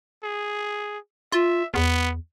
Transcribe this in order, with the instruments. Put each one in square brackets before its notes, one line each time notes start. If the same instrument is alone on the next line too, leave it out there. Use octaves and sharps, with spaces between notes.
[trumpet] G#4
[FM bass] F4 [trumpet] E5
[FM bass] E2 [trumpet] B3